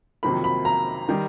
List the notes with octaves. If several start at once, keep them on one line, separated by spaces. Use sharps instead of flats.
F2 C3 D#3 F#3 A#3 B5
B5
A#5
D#3 G3